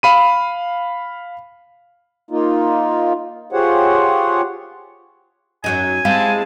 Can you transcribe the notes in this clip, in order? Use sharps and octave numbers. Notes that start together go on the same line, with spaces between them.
F5 B5 D#7
A#3 D#4 F4
F4 G4 G#4 C5 C#5 F#5
F#2 F#3 D#4 G#5
G#3 C4 E4 G4 F5 A5